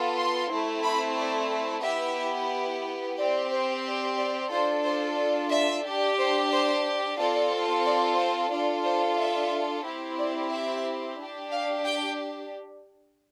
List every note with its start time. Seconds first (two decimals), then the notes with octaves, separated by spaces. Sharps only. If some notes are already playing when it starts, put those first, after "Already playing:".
Already playing: B3 F4 A4
0.17 C6
0.51 A3 C4 E4
0.84 B5
1.17 D5
1.84 B3 E4 G4 E5
3.17 C4 G4 D5
3.51 C5
3.84 D5
4.17 D5
4.50 D4 F4 A4 C5
4.84 C5
5.51 E5
5.84 D4 G4
6.17 C5
6.51 C5
7.18 C4 F4 A4 D5
7.84 D5
8.18 C5
8.51 D4 F4 A4 D5
8.84 C5
9.18 E5
9.84 C4 E4 G4
10.18 D5
10.52 E5
11.18 D4 G4
11.51 F5
11.85 G5